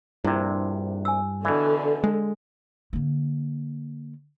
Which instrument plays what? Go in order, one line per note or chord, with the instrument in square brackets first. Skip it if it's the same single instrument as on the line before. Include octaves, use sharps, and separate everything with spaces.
[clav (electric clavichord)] A#1 C3 [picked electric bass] G2 [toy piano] E4 D5
[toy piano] G#5 E6
[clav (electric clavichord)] B2 E3 [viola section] D3 [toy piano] D5
[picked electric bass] G#3
[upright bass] D3 A#3